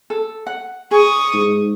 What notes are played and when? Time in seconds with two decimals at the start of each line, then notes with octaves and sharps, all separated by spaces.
0.10 A4
0.47 F#5
0.91 G#4 C#6 D#6
1.34 G#2